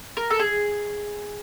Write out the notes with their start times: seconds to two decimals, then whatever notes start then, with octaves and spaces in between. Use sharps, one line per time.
0.17 A#4
0.30 A4
0.40 G#4